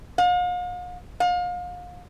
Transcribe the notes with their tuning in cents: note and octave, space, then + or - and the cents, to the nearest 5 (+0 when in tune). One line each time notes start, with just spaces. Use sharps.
F5 +45
F5 +35